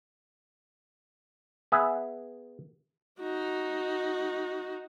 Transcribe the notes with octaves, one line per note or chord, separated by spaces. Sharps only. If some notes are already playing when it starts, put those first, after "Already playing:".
B3 G#4 E5
D#4 F#4